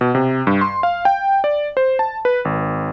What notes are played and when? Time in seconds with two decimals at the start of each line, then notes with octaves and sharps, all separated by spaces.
0.01 B2
0.15 C3
0.47 G2
0.61 C6
0.83 F5
1.05 G5
1.44 D5
1.77 C5
1.99 A5
2.25 B4
2.45 G#1